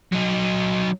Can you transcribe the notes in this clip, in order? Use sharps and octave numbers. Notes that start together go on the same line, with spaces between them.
F#3 D#4